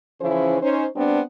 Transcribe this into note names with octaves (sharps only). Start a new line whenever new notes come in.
C#3 E3 F3 C#4 E4 C5
C#4 D#4 C5
G3 B3 C4 D4